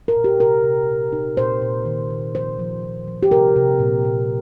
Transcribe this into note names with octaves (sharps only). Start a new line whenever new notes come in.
A#4
A#2
G4
C3 A#4
C3
A#2
D#4
A#2 C5
A#2
D#3
D#3
F3 C5
F3
F3
F3
G4
C3 A#4
C3
A#2
A#2